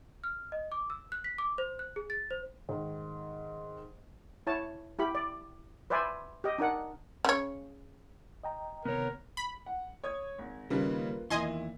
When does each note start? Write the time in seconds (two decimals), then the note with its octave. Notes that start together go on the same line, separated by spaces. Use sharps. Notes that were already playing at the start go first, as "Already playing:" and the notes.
0.24 F6
0.52 D#5
0.72 D6
0.90 E6
1.12 F#6
1.24 B6
1.38 D6
1.58 C5
1.79 F#6
1.96 G#4
2.10 A6
2.31 C5
2.69 G#2 D#3
4.47 E4 C#5 A5
4.99 E4 G4 B5
5.15 D5
5.90 B4 C5 D5 E5 G#5
6.44 G4 D#5
6.58 D4 D#4 A#4 F#5
7.25 C#3 C#5
8.44 D#5 G5 A#5
8.85 C3 D#3 B3 A#4 C#5
9.37 B5
9.66 F#5
10.04 C#5 D#6 G#6
10.39 G#1
10.70 D#2 C#3 G3 A#3 D#4 F4 B4
11.30 E2 A#2 D#3 E4 D#5 G#5 C6